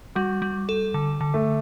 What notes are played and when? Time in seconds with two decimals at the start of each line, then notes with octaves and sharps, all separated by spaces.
0.15 G3 F#4
0.42 G3
0.69 A4
0.94 D3
1.21 D3
1.34 A3